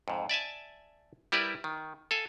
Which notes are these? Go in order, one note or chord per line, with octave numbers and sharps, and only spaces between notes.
F2 G#2
D5 E5 G#5 A5
G3 E4 G4 A#4 B4 D5
D#3
A4 F5 G#5